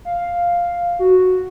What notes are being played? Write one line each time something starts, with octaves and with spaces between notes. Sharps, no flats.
F5
F#4